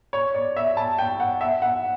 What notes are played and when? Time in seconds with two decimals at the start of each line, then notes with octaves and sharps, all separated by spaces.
0.13 C#5
0.35 D5
0.56 E5
0.77 A5
0.98 G5
1.20 F#5
1.41 E5
1.62 F#5